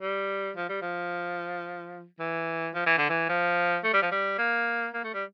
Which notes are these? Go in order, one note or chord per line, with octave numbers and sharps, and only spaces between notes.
G3
F3
G3
F3
E3
F3
E3
D3
E3
F3
A3
G3
F3
G3
A#3
A#3
A3
G3